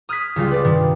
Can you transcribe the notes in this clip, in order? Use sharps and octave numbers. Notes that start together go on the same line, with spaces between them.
D#6 F6 F#6 G#6 B6
C#2 C#3 G3 F4
B4 D5
G2 C3 D#3